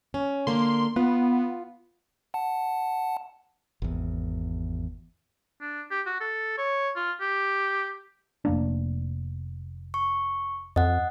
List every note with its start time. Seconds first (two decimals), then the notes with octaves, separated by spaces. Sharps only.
0.14 C#4
0.47 D3 A#3 A#4 C6
0.96 B3 F4
2.34 F#5 A5
3.82 G#1 E2
5.61 D4
5.91 G4
6.06 F#4
6.21 A4
6.58 C#5
6.96 F4
7.21 G4
8.45 F1 A#3 D4
9.94 C#6
10.76 F2 D#5 F#5